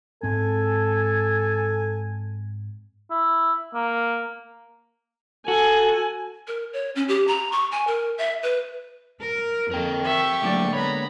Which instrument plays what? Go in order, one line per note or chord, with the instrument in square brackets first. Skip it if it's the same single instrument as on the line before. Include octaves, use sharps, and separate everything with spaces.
[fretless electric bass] G#2 C4 [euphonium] A4 [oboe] G#5
[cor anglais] E4
A#3
[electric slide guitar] F#4 [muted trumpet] A4 [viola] G#5
[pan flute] A#4
C#5
C#4
G4
A#5
C#6
G#5
A#4
E5
B4
[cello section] A#4
[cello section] F2 [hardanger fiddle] A#3 A4 [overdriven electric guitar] A#4 G5
[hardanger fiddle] G4 C#6 [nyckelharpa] E5
[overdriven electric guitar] A2 F#3 [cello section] D3 G#3 A#3 [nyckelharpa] D5
[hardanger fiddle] B3 A#5 [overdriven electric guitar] C#5 [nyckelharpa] B5